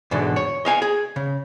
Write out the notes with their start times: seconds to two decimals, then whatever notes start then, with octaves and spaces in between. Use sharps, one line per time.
0.11 E2 G#2 B2 D3
0.36 C#5
0.65 D#5 F5 G#5
0.82 G#4
1.16 C#3